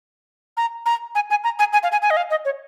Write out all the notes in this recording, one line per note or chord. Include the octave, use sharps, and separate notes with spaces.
A#5
A#5
G#5
G#5
A#5
G#5
G#5
F5
G#5
G#5
D#5
F5
D#5
C#5